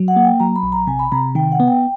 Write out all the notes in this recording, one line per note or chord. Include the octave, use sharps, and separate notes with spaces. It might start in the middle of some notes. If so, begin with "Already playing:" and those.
Already playing: F#3
F#5
A#3
G5
F#3 A#5
B5
A#1
A#5
C3 G#5
B5
C3 A#5
D#3 G5
F#5
B3
G5